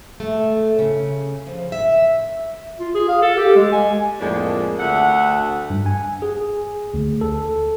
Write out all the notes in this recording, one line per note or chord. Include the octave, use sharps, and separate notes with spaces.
A3
C#3
F3
E5
F4
G#4
F5
A4
G4
G#3
G#5
F2 A2 G#3 A#3 D4
D2 E5 F#5
G2
G#5
G#4
D2
A4